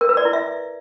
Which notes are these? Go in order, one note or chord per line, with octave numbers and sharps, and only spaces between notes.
A#4
B4
D5
E4
E5